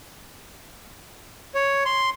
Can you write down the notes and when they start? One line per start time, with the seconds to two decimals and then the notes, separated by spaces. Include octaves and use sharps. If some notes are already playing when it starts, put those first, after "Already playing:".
1.55 C#5
1.86 C6